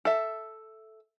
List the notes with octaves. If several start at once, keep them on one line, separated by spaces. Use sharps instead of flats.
A4 E5